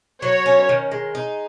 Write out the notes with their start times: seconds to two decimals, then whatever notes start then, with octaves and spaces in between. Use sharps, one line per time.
0.22 F#3 C#5
0.46 C#4
0.69 D#3
0.91 G#3
1.15 D#4